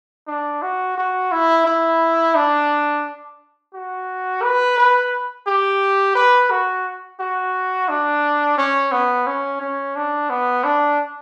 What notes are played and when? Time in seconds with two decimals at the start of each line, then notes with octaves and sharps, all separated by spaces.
0.27 D4
0.62 F#4
0.97 F#4
1.32 E4
1.66 E4
2.35 D4
3.74 F#4
4.42 B4
4.77 B4
5.47 G4
6.15 B4
6.51 F#4
7.20 F#4
7.89 D4
8.58 C#4
8.92 B3
9.27 C#4
9.61 C#4
9.96 D4
10.30 B3
10.64 D4